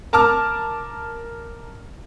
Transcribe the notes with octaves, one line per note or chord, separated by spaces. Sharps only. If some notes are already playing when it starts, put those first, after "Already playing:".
A#4 A5 A#5 D6 F6